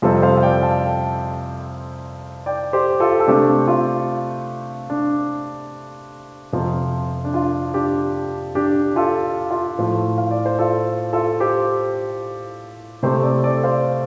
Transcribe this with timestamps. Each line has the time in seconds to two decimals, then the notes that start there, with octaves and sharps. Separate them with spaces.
0.02 F2 C3 G3 C4 F4 A4
0.22 C5 F5
0.37 F5
0.43 D5 G5
0.63 F5 A5
2.46 D5 G5
2.73 G4 C5
3.00 F4 A4
3.20 A4
3.27 C3 A3 C4 D4 G4
3.68 F4
4.90 D4
6.53 F2 C3 F3
7.25 D4
7.34 F4
7.74 D4 G4
8.55 D4 G4
8.96 F4 A4
9.51 F4
9.78 A2 F3 A3
10.18 F5
10.31 D5
10.46 C5
10.58 F4 A4
11.13 F4 A4
11.40 G4 C5
13.03 C3 A3 C4 G4 C5
13.23 A4 D5
13.44 A4 D5
13.64 C5 F5